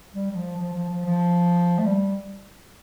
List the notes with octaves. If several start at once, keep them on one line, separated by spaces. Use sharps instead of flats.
G3
G3
F3
F3
F3
F3
F3
A3
G3